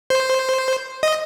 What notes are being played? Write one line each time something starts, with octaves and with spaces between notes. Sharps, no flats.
C5
D#5